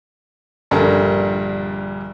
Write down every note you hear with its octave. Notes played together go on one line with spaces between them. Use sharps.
A#1 G2 D3 G3 A#4